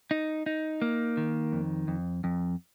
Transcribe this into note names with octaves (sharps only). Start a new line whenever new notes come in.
D#4
D#4
A#3
D#3
F2
F2
F2